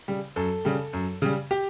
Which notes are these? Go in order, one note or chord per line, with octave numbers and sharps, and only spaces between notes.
C#3 G3
F#2 A4
C#3 G3
F#2
C#3 G3
G4